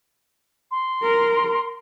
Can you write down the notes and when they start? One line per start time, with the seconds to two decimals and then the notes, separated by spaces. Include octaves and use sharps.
0.71 C6
1.02 A#4